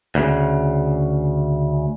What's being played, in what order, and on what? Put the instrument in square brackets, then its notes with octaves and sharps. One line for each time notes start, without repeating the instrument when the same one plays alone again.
[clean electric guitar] D2 C#3